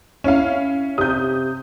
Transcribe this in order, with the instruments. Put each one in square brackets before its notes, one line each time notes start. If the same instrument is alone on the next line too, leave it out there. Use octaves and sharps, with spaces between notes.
[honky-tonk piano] C#4 E4 F5
[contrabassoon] C3 [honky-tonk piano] D#6 G6